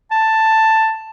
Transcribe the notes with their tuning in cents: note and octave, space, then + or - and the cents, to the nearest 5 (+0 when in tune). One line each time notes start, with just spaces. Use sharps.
A5 +5